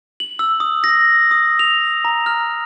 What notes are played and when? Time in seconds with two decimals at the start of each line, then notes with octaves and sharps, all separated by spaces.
0.20 F#7
0.39 E6
0.60 D#6
0.84 A#6
1.31 D#6
1.59 F7
2.05 A#5
2.26 F6